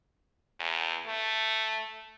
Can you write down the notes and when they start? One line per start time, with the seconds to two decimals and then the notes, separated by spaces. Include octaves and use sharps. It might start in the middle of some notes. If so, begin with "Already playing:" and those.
0.60 E2
1.07 A3